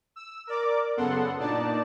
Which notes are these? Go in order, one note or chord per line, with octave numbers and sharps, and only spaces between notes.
E6
A#4 D5 D6
F#2 C#3 B3 A4 F#5 C6
A#2 D4 D#4 D5 A5